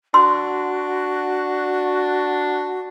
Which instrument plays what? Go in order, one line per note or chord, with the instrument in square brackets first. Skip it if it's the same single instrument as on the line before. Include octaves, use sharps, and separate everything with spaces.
[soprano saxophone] D4 [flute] F#4 [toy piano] C6